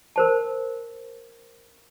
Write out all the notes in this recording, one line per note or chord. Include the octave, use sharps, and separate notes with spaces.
A#4 C5 A5